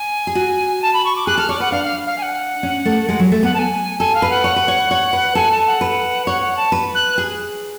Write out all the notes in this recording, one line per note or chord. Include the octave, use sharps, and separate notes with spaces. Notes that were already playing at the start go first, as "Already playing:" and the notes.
Already playing: G#5
G#4
F#4
A5
B5
C#6
D6
G#4 F#6
A4 F6
C#5 D6
B4 F#5
D4 F5
F5
F5
G#5
F#5
C#4
A3
G#3
F#3
A3
B3 F#5
A5
G#5
A4 G#5
F5
B4
F#5
C#5
B4
C#5
C#5
B4
A4 G#5
A5
F#5
B4
C#5 F#5
F#5
A5
B4
F#6
G#4